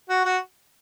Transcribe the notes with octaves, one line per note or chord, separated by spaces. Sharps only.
F#4
F#4